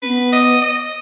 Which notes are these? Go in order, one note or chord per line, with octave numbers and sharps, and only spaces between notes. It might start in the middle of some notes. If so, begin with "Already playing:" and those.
B3 C#4 B4
D#5
D#5